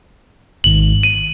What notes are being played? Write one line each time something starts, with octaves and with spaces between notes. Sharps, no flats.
G#1 G#2 D#3 F#7
D#7